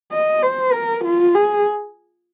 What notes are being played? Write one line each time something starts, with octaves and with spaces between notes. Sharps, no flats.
D#5
C5
A#4
F4
G#4